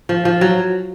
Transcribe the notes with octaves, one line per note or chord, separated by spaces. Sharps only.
F3
F3
F#3